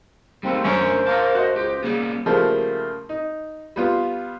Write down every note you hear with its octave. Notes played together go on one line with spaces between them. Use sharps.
D#2 G3 A3 C4
F#2 D3 A3 C#4 A#4 C5
A#3 A#4 A5
F#4 D#5
C#2 G4
C#3 G3 A#3 B3
C#3 F3 G3 A3 A#3 E4
D#4
G3 B3 F4